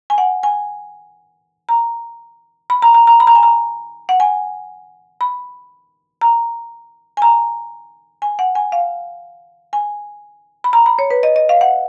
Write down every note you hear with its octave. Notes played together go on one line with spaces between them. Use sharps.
G#5
F#5
G#5
A#5
B5
A#5
A#5
A#5
B5
A#5
G#5
A#5
F#5
G#5
B5
A#5
G#5
A#5
G#5
F#5
G#5
F5
G#5
B5
A#5
B5
C#5
B4
D#5
D#5
F5
F#5